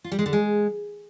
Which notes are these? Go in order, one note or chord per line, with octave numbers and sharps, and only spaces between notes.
F4
G3
G#3
D3
G#3